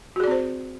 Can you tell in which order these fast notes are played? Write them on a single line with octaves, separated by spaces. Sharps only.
F#4 G#4 D5 C4 C5